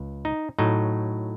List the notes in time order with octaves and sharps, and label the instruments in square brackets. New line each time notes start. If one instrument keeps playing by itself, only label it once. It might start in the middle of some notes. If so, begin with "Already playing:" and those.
Already playing: [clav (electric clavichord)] C#2
D#4
A2 F#3 D#4